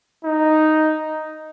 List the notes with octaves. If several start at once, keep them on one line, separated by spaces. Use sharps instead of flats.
D#4